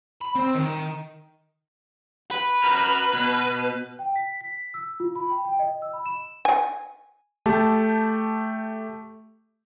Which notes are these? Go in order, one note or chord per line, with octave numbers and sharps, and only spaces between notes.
B5
C4
D#3
B4
F#4 A#4
B2
G5
B6
B6
E6
F4
B5
G5
G5
D#5
E6
B5
E7
G#5
A3 G4 A5